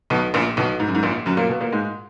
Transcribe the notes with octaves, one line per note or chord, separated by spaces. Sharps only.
B1 B2
A#1 A#2
B1 B2
G#2
F#2
G#2
A#1 A#2
F#2 F#3
A#2 A#3
B2 B3
A#2 A#3
G#2 G#3